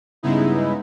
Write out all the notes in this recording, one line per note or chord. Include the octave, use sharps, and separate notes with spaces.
G2 C#3 G#3 B3 D#4 E4